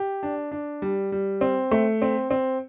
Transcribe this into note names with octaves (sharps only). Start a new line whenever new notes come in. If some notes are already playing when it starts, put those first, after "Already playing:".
Already playing: G4
D4
D4
G3
G3
C4
A3
C4
C4